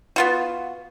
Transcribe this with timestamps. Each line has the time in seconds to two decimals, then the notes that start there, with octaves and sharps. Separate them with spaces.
0.16 B3 F4 F#4